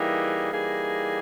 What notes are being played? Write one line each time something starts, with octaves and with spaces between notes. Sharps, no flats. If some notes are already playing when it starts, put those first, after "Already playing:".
Already playing: E3 G3 A#3 D#4 G#4
E3 G3 A#3 D#4 G#4